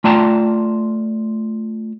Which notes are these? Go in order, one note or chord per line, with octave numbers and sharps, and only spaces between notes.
A3 F4 D5 G5 A5 A#5